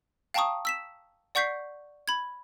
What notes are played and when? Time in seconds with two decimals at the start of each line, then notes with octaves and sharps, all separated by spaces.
0.34 F5 G5 A5 A#5 C#6 D#6
0.65 E6 B6 E7
1.35 D5 F#5 C#6 G6 B6 C7
2.08 B5 G#6